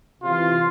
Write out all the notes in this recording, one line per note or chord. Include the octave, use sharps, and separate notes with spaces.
C3 E3 F4